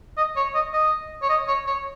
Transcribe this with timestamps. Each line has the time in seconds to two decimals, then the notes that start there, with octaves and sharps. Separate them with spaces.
0.18 D#5
0.36 C#5
0.54 D#5
0.73 D#5
1.22 C#5
1.30 D#5
1.48 C#5
1.67 C#5